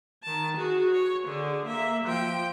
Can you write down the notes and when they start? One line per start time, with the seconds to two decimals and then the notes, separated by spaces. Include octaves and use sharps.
0.23 D#3 A5
0.56 F#4 G#4
0.91 C#5
1.25 D3 G#4
1.65 A#3 E5
2.04 F3 G5